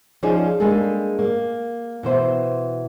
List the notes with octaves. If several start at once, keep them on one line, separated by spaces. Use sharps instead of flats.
F3 C#4 D#4 G#4 D5
G3 G#3 A#3 D4 G#4 A4
A#3
B2 E3 C5 E5